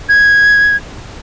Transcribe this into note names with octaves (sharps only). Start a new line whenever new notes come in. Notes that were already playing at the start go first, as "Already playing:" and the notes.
G#6